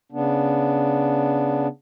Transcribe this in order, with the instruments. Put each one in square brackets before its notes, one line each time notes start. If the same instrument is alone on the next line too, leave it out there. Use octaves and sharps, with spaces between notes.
[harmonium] C#3 B3 D4